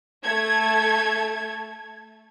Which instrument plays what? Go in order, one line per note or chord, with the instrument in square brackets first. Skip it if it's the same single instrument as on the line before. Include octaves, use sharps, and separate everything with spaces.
[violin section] A3 A4 G#6